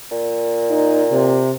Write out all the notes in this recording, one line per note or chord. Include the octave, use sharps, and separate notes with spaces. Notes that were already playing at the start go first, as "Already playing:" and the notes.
A#2
D#4
C3